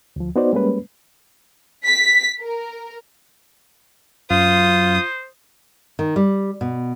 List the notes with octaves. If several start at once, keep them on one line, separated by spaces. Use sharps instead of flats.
D2 F3
B3 D#4 F#4 C5 D5
G3 G#3 A#3 C#4 B4
B6
A#4
F#2 F4 C5 D#6
D#3
G3
B2